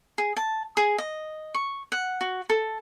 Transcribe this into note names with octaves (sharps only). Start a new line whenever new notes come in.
G#4
A5
G#4
D#5
C#6
F#5
F#4
A4